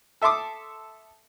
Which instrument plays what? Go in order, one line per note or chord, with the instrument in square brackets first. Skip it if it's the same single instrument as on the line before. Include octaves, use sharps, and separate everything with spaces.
[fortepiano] A4 E5 A5 C6 D6 D#6